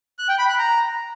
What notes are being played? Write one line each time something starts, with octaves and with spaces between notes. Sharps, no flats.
F#6
G5
B5
F#6
A#5